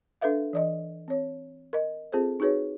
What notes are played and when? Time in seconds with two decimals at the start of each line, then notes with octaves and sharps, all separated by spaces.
0.21 D4 A4 B4 E5 F5
0.53 E3 D5 D#5
1.08 C4 C#5
1.73 A#4 D#5
2.12 C4 F4 G#4 A4 C5
2.40 D#4 F#4 G#4 B4 C#5